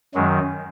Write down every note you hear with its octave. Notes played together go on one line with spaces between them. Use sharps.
F#2 D#3 F#3 G#3